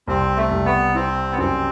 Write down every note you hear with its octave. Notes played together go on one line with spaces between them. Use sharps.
C2 C4
A3
C2
B3
C4 E4
B3
F#2 C4